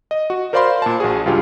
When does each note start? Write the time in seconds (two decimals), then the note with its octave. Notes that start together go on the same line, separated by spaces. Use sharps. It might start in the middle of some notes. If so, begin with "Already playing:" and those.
0.11 D#5
0.30 F#4
0.53 A#4 C5 D5 F5 B5 C6
0.82 A#2 A5
1.00 A#1 F#4 G#4
1.26 C#2 G2 F4 G4 G#4